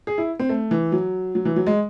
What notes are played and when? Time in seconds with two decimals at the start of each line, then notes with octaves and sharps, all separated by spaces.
0.07 G#4
0.18 E4
0.40 C4
0.49 A3
0.71 E3
0.92 F#3
1.35 F#3
1.45 E3
1.56 F#3
1.66 G#3